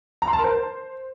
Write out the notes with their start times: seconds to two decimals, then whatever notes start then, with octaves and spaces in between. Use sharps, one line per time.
0.22 A#5
0.28 C6
0.33 A5
0.39 A#4
0.44 C5